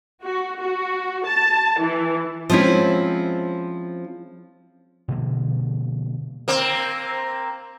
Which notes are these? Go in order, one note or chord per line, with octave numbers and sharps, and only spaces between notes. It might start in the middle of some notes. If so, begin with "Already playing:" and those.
F#4
F#4
A5
E3
F3 G#3 C4 C#4 E4
B2 D3 F3 A#3
A#3 C4